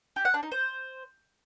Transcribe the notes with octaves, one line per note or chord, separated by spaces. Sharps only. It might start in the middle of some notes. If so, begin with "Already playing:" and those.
G4
F#5
D4
D#4
C5